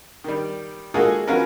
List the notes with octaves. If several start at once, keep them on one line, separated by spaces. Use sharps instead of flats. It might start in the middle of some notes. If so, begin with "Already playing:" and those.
D#3 G3
G#3 A#3 F4 F#4 G#4 A4
F3 C#4 F#4 A#4 B4 F5